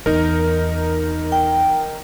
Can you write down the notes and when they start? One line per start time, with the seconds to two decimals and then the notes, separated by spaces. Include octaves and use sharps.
0.06 E2 D#4 A#4
1.32 G5